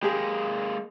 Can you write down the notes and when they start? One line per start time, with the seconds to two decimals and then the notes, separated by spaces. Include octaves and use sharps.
0.03 G#3 A#3 G4 G#4